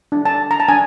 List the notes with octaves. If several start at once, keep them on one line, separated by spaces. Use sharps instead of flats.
D4
A5
D4
A#5
A5
D4 G#5